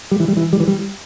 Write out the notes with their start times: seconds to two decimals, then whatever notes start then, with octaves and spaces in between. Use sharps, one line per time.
0.11 G3
0.20 E3
0.28 G3
0.37 E3
0.53 G3
0.60 E3
0.68 G3